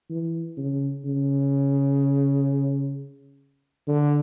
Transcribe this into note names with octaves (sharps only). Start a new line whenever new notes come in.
E3
C#3
C#3
D3